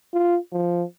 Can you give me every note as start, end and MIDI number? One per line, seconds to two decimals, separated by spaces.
0.14 0.38 65
0.53 0.83 53